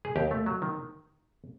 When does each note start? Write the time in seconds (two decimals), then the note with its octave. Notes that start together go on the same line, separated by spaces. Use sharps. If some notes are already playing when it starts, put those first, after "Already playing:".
0.05 G#4
0.16 D#2 G4
0.31 A3
0.46 F#3
0.62 D#3